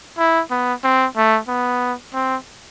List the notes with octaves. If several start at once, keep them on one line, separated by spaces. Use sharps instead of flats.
E4
B3
C4
A3
B3
C4